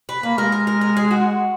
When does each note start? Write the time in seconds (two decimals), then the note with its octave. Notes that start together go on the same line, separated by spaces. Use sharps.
0.09 B4
0.23 A#3 B4
0.37 G#3 A#4
0.52 A#4
0.67 A#4
0.81 A#4
0.97 G#4
1.11 F#4